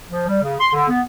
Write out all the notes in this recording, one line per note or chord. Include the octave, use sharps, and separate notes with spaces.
F3
G3
C#3
C6
D3
B3